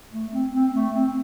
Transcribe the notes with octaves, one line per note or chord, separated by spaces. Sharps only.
A3
C4
C4
A3
C4